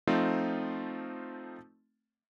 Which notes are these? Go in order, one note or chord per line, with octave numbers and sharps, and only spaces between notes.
F3 A3 C4 D#4 F4